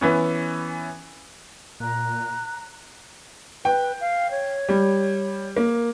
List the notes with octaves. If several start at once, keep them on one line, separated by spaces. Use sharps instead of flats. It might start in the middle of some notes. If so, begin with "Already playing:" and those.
E3 B3 C#4
A#2 A#5 F#6
B4 G5
F5
C#5
G3
A#3